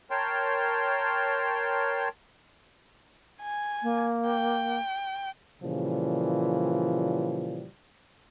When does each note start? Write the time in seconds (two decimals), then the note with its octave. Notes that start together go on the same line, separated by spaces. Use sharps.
0.11 A#4 C#5 G5 A5 C6
3.42 G#5
3.83 A#3
4.28 G5
5.62 A#2 C#3 E3 F3 G3